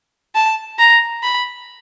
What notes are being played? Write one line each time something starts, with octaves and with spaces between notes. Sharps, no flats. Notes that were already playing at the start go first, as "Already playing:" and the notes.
A5
A#5
B5